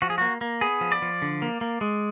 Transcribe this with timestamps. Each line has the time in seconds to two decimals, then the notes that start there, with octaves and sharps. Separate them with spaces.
0.02 F3 F#4
0.10 G#4
0.18 A#3 F#4
0.41 A#3
0.61 B3 G#4
0.81 F3
0.92 D5
1.02 F3
1.22 D3
1.42 A#3
1.61 A#3
1.81 G#3